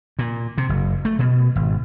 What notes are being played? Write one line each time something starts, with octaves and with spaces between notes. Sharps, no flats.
A#2
C3
F#1
A3
B2
G#1